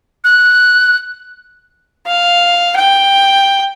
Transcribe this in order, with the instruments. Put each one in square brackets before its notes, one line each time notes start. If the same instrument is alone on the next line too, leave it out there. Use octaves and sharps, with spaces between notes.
[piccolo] F#6
[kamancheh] F5
G5